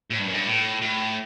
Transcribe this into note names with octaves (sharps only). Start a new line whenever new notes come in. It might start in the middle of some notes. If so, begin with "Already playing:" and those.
A2
G2
F#2
G2
A2
A2